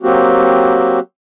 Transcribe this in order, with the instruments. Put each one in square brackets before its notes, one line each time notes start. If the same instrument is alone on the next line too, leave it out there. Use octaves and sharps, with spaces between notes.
[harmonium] F#3 A#3 C4 F#4 G4